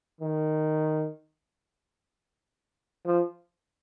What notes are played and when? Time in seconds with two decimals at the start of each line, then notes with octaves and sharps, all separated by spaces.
0.21 D#3
3.06 F3